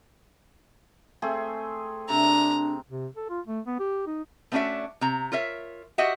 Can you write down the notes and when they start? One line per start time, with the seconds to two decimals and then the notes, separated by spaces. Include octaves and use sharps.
1.22 A3 C4 G#4
2.09 C3 D4 A#5
2.90 C3
3.16 A4
3.29 F4
3.47 A3
3.66 B3
3.79 G4
4.07 D#4
4.52 A3 B3 C#4 D4 F#4 E5
5.01 C3 A#5
5.32 F4 A#4 C#5 E5
5.98 F#4 G4 D#5 E5 F#5